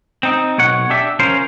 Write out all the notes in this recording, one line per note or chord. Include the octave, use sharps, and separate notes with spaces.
C4 D#4
B1 B2 C#5 F#5
D4 G4 E5
F3 C#4 A#4 C5